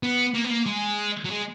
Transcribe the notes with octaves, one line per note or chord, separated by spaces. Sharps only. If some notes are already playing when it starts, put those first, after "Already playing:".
B3
A#3
B3
A#3
G#3
F#3
G#3